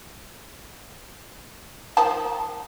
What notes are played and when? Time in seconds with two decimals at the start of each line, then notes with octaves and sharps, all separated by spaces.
1.97 D#3 F3 A5